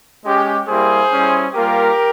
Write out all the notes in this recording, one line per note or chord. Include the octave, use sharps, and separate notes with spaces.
G#3 C#4 G4
G3 A#3 E4 G4 G#4 C5
G3 C#4 E4
G3 A#3 F4 G4 A#4